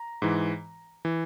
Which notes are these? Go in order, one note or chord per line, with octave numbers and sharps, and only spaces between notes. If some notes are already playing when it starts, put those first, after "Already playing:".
Already playing: A#5
G#2 E3
E3